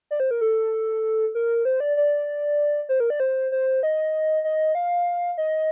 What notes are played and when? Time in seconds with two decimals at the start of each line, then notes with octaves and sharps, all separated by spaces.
0.11 D5
0.20 C5
0.31 A#4
0.41 A4
1.35 A#4
1.65 C5
1.80 D5
1.97 D5
2.89 C5
3.00 A#4
3.10 D5
3.20 C5
3.52 C5
3.83 D#5
4.44 D#5
4.75 F5
5.38 D#5